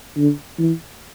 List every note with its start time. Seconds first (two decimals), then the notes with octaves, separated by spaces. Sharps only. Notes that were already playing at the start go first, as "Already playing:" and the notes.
0.17 D3
0.59 E3